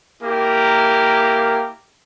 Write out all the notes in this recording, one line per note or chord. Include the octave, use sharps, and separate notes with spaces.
A#3 E4 G4 A#4